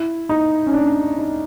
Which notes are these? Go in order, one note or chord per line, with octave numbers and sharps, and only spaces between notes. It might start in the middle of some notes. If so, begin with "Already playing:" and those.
Already playing: E4
D#4
C#4
D4
D#4